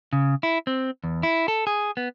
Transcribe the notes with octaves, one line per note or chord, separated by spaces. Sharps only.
C#3
E4
C4
E2
E4
A4
G#4
B3